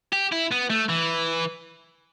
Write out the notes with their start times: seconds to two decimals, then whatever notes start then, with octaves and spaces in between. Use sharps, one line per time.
0.13 G4
0.32 E4
0.51 B3
0.70 A3
0.89 E3